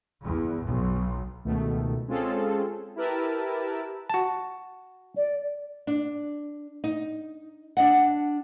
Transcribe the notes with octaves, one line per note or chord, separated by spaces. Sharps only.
E2
B1
C#2 B2 D#3 A3
G#3 C4 C#4 F4 G#4 A4
E4 G4 A#4 B4 A5 E6
F#4 A5
D5
D4
D#4
D4 D#5 F#5